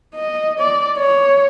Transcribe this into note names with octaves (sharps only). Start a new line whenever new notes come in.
D#5
D5
C#5